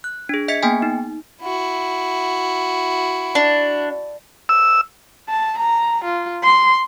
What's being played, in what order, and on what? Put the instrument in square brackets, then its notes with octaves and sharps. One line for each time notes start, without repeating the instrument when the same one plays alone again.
[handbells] F#6
D4 G#4
D#5 E5 G#6 B6 C#7
A#3 B3 G#4 G5 G#5
D#4
[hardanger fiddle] E4 F#4
[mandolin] D4
[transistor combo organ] E6
[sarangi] A5
A#5
F4
C6